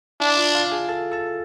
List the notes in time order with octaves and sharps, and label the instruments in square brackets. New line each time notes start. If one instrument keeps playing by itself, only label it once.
[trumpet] D4 [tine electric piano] E4 E5
[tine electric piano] F4 F5
F4 F5
G#4 G#5
A4 A5
A4 A5